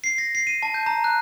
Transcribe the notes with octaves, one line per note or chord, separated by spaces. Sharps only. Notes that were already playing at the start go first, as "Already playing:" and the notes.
C7
A#6
C7
D#7
A5
G6
A#5
F#6